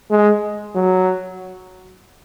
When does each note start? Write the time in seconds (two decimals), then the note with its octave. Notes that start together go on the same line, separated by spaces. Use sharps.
0.11 G#3
0.75 F#3